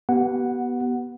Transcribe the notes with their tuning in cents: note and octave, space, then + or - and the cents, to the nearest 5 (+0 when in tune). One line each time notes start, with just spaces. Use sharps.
B3 -15 G4 -40 F#5 +0